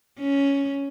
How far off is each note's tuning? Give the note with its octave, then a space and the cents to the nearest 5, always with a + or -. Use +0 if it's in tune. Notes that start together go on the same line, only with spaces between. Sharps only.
C#4 +5